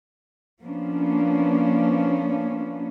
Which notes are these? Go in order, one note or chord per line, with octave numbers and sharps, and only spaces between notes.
F3 A#3 B3 C#4 D4